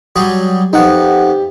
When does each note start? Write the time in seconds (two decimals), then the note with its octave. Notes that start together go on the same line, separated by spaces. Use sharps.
0.16 F#3 G3 G#4
0.73 F2 B3 D#4 G4 F#5